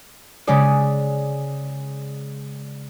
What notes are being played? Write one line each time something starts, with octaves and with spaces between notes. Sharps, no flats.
C#3 G#3 C#4 G#4 D5